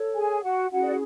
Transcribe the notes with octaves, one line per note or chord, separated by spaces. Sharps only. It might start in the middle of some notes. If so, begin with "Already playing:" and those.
Already playing: A4 C#5
G#4 G#5
F#4 F#5
C#4 E4 F#4 G#4 F#5
D5